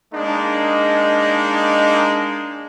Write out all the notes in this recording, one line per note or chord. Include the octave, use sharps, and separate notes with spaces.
G#3 A#3 D4 D#4